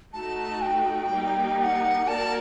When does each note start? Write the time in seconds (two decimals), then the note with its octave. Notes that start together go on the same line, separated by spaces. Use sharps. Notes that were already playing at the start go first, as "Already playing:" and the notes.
0.13 A3 D#4 F#4 A5
0.61 G5
1.10 G3 A#3 D#4
1.58 G5
1.63 F#5
2.07 A#3 F#4 A#4 D5 A5